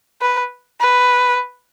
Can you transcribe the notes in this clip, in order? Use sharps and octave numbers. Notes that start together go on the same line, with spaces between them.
B4
B4